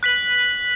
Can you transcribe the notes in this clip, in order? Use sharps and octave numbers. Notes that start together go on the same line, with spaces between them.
F#6 B6 F#7